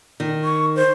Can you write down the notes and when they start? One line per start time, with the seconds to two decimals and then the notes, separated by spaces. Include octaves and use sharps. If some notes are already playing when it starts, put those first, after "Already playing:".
0.20 D#3
0.44 C#6
0.76 C5